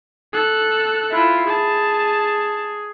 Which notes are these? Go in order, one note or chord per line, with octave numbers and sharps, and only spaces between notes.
A4 F#6
E4 F4
G#4 A5